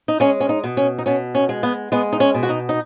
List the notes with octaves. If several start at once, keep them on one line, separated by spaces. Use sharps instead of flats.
D#4
G#3 C#4
C#4
D#4
B2
C#4
D#4
B2 C#4
C#4
G#3
B3
G#3 B3
D#4
C#4
B2
F#4
D#4
D#4